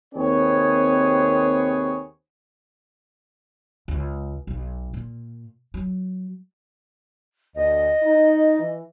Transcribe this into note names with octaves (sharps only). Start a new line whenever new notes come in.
D#2 C3 C4 G#4 B4 C#5
C#2
B1
A#2
F#3
D2 D#5
D#4
E3